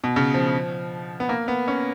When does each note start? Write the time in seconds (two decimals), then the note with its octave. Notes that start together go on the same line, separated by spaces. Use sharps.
0.04 B2
0.16 C#3
0.34 F3
1.20 B3
1.29 A#3
1.48 B3
1.68 C#4